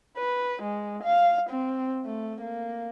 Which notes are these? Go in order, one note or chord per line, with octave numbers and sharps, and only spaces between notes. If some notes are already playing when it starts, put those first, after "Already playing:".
B4
G#3
F5
C4
A3
A#3